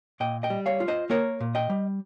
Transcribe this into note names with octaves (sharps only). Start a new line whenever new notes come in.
A#2 D#5 G5
D#5 G5
G3
C#5 F5
F4
C5 D#5
A#3 A#4 C#5
A#2
D#5 G5
G3